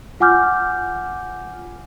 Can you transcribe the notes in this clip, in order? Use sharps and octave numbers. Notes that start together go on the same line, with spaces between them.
F4 F#5 G#5 D6 F6 G6